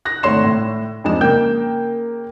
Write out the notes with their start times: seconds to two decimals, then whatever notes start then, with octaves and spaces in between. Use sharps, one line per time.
0.05 F#6 A#6
0.23 G#1 A3 C#5 C6 E7
0.44 A2
1.04 F2 G#2 G#3 D4 E7
1.21 C#3 A#3 A#4 G5 G6